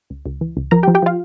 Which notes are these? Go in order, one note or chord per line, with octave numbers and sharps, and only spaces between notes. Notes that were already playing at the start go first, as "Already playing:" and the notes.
C#2
C#2
E3
C#2
F3 A#4 A#5
G4 G5
F3
G4 G5
F3 F4 F5